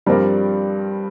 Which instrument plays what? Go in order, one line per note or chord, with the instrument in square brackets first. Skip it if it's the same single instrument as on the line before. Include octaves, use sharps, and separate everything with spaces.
[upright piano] G2 F3 C4 A#4 D5 [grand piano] G3